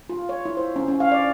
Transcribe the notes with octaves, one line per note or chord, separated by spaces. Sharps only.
F4
C#5
E4
C5
C#4
C#4
F5
D5